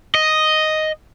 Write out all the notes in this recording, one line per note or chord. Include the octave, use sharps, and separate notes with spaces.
D#5